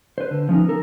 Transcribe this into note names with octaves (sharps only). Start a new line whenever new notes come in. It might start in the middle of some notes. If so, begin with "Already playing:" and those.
B4 C5
D3
F3 B3 C#4 D#4
A4 A#4